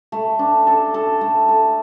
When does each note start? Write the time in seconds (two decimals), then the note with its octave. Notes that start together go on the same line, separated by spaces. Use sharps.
0.12 A3
0.39 D4
0.67 A4
0.94 A4
1.21 A3
1.49 A4